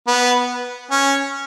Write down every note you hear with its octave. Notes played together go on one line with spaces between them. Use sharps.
B3
C#4